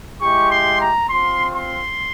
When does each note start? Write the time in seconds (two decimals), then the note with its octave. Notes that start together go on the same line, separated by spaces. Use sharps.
0.21 G#3 E4 G4 C#6
0.51 C6
0.81 A#5
1.10 C4 F4 C6
1.54 C6